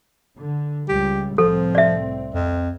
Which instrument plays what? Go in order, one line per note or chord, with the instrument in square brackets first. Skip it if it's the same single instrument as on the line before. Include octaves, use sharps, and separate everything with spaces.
[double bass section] D3
[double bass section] C#2 G3 [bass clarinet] G4
[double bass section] C2 A2 C4 [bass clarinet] F3 [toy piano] A4
[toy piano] D5 E5
[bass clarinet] F2